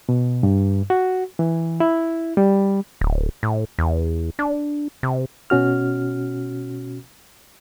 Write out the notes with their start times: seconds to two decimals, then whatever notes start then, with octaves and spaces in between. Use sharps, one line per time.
0.09 B2
0.43 G2
0.90 F#4
1.39 E3
1.80 E4
2.37 G3
3.01 D1
3.43 A2
3.79 E2
4.39 D4
5.03 C3
5.50 B2 C#4 F#4 F6